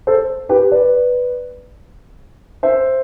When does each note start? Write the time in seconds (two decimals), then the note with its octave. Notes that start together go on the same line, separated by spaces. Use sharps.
0.07 A4 C5
0.49 G4 B4
0.72 B4 D5
2.63 C5 E5